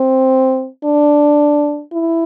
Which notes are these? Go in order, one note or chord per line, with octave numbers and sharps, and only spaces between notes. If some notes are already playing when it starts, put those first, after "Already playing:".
Already playing: C4
D4
E4